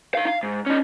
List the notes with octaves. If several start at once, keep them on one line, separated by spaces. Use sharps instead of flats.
D#4 F5
F5
G#2
C#4 D#4